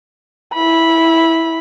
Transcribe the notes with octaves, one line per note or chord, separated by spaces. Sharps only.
E4 B5